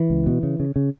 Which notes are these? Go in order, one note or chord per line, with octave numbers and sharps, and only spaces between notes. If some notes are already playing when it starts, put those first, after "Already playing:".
Already playing: E3
C#2
B2
C#3
C#3
C#3